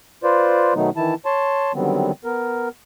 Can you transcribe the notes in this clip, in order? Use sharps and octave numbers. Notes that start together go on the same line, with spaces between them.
F4 B4 C5 D5
B2 D#3 F#3 A3 B3 D#4
D#3 E3 E4 A5
C#5 A5 C6
D3 D#3 F#3 G3 B3 C4
B3 A#4